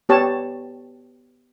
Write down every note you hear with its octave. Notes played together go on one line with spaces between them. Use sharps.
B3 G4 C#5 A5